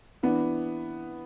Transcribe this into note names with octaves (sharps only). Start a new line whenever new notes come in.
E3 B3 D4